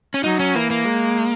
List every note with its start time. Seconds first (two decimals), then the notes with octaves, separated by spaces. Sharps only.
0.14 C#4
0.24 F#3 D#4
0.40 C#4
0.55 E3 A#3
0.71 A#3
0.85 G#3